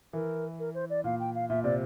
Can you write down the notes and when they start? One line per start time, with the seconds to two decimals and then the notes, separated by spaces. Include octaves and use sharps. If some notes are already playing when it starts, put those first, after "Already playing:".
0.13 E3 A#4
0.59 A#4
0.74 C5
0.90 D5
1.04 A#2 F5
1.20 G5
1.35 F5
1.49 A#2 E5
1.64 C3 D5